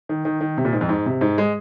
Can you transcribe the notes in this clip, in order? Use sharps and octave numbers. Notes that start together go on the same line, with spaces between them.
D#3
D#3
D#3
C3
A#2
G#2
F2
G#2
C3
G#2
G#3